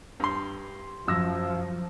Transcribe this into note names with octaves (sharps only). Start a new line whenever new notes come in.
G2 C6
F#2 F3 E6 A#6